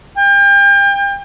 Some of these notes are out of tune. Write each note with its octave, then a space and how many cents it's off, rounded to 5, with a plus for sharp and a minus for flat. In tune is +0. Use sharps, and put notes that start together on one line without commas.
G5 +35